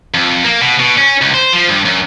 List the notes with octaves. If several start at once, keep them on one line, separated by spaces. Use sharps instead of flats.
F2
A#3
B2
B2
C#4
C#2
C5
F3
G2
F#2